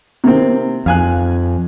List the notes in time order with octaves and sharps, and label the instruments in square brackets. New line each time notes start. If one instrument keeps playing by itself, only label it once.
[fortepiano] C3 A#3 C4
[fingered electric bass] F2 [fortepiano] F5 G#5 F#6